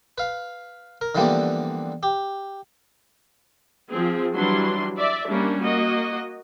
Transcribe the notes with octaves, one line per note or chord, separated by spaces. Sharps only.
B4 F5
A#4
D3 E3 F3 G3 A#3 B3
G4
F3 C4 G#4
E3 F#3 G3 D4 C6
D5 E5
G3 A#3 C#4 D4
A#3 F#4 D#5